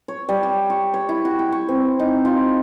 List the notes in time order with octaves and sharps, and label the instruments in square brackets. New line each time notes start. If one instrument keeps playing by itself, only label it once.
[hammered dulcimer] C#5
G3
G4
C#6
C#5
E4
F#4
G5
C#6
C4
D#4
F4